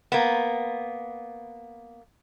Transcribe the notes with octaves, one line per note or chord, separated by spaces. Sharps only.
A#3 B3